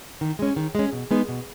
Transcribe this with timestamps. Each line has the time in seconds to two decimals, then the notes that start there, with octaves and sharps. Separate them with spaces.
0.21 D#3
0.39 G#3 C#4
0.56 D#3
0.75 G#3 C#4
0.93 B2
1.11 G#3 B3 D#4
1.29 B2